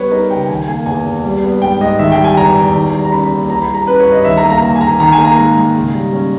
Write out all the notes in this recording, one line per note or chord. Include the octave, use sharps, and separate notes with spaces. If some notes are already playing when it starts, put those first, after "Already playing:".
Already playing: G3 B3 B4 C#5
D#4 A#4
C#3 G5
G5
D#3 G#5
A#3 G#5
E2 G#5
E2
G3
B3
G#2 G5
G#2 D#5
D#3 E5
G5
G3
G#5
E2 A#5
E2
D#3
G3
A#5
C#4 B5
D#2
E3 A#5
B5
G3
A#5
C#4 B4
C#5
G2
D#5
D#3 E5
A#5
A#3
A#5
D#2 A#5
G#5
D#2 A#5
D#3 A#5
G#5
A#3
A#5
G#2 A#5
G#2
C#3
G3
C#4